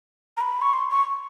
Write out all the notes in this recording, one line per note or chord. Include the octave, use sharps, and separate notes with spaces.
A#5
B5
C#6
C6
C#6